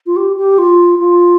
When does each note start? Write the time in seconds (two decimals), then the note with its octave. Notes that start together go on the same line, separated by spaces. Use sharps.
0.06 F4
0.16 G4
0.36 G4
0.58 F4
0.99 F4